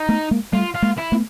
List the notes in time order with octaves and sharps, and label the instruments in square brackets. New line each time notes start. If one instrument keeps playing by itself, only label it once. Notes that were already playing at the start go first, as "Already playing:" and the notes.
Already playing: [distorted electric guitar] D#4
[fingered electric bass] A3 B3
G#3 A#3
[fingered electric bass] G3 A3 [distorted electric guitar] F4
[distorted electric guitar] F4
[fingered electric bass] G#3 A#3
[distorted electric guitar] E4
[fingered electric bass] A3 B3